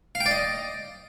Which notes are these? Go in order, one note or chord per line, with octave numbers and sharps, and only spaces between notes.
F5
G5
D5
D#5